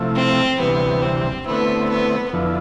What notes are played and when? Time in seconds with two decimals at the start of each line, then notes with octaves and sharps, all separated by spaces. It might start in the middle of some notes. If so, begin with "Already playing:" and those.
Already playing: C3 F3 A3 E4
0.15 C4
0.59 D2 C3 E3 G3 B3
1.02 C4
1.46 D3 A3 B3 C4 E4
1.89 B3
2.33 F2 D3 F3 B3 E4